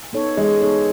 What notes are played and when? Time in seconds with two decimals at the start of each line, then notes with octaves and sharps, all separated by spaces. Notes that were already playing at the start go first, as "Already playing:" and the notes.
0.13 B3 D#4 A4 C#5
0.37 E3 G#3
0.61 B3 D#4 A4 C#5